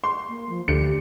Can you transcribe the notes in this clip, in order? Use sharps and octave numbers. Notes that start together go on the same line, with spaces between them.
C6
A#3
F3
D2 G4 C#7